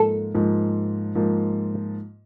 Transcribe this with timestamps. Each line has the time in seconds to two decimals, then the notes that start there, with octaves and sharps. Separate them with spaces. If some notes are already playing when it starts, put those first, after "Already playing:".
Already playing: G#2 F3 A#3 A4
0.34 G#2 F3 A#3
1.15 G#2 F3 A#3